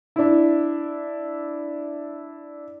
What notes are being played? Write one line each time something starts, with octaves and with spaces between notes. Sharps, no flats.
D4 E4